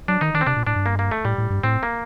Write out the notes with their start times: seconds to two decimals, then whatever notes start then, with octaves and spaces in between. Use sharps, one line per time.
0.08 F#3 D4
0.21 D#3 D#4
0.34 D#3 D4
0.41 C4
0.47 C3 D4
0.56 A#2
0.67 A2 D4
0.76 G2
0.86 A#3
0.99 A#3
1.11 A3
1.25 A2 G3
1.38 A2
1.50 G2
1.64 A2 C4
1.83 A#3